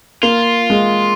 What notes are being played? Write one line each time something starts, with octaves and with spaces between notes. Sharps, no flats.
A#3 F4
G#3